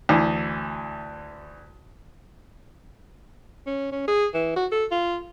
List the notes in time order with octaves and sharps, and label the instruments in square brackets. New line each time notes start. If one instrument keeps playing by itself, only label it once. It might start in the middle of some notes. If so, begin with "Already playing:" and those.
[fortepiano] D2 E3
[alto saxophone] C#4
C#4
G#4
E3
F#4
A4
F4